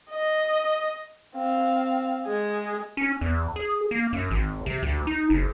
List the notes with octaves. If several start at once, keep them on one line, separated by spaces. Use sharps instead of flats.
D#5
C4 F5
G#3 G#4
C#4
E2
G#4
A#3
F#2
G#1
C3
D2
D#4
F#1